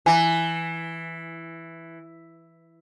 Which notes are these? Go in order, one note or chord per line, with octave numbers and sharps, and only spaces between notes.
E3 G#5 A#5